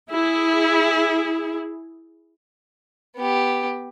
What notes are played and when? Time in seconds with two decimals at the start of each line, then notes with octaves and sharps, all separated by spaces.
0.12 E4 G#4
3.16 B3 G4